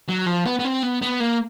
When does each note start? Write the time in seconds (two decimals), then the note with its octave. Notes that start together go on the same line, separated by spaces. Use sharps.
0.09 F#3
0.27 F3
0.46 B3
0.59 B3
0.64 C4
0.82 B3
1.02 B3
1.20 A#3